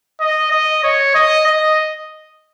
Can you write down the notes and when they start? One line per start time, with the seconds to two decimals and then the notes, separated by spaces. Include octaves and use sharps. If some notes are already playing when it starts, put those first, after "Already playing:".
0.20 D#5
0.51 D#5
0.83 C#5
1.14 D#5
1.46 D#5